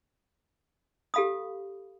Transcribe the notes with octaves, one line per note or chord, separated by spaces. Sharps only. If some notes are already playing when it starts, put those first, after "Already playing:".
G4 A4 F5 B5 D#6